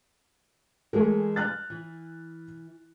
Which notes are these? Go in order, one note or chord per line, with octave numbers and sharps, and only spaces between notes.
E3 G#3 A3 G#4 A#4
F6 F#6 A6
E3